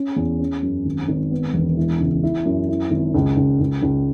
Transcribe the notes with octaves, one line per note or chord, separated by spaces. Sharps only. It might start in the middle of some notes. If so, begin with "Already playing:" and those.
Already playing: C#4
E2
C#4
F#2
G#1
G#1
B3
E1
E4
C#2
E4
F#2
E4
G#1
C#2
C#2
C#2
C#2